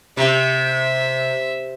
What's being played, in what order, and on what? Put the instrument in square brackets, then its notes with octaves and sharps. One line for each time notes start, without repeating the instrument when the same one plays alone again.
[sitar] C3 [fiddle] E5